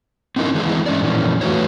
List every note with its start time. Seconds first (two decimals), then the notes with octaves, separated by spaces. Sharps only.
0.36 C4 C#4 D#4 E4 A#4
0.55 D#3 E3 G#3 E4 G#4
0.86 G#3 C#4 D5
1.01 F2 A#2 E3 C#4
1.41 E3 A3 C#4 F#4 B4 C#5